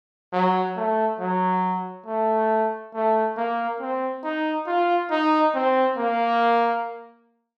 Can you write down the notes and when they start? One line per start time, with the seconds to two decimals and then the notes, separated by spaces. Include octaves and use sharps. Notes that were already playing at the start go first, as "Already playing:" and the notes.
0.33 F#3
0.76 A3
1.19 F#3
2.06 A3
2.94 A3
3.37 A#3
3.80 C4
4.24 D#4
4.67 F4
5.11 D#4
5.55 C4
5.97 A#3